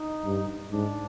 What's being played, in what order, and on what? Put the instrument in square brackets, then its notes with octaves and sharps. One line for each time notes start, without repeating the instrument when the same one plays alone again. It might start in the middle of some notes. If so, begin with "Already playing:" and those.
Already playing: [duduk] D#4
[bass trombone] G2
[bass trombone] G#2 [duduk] D4